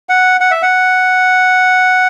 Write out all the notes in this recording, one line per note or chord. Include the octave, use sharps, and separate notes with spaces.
F#5
F#5
E5
F#5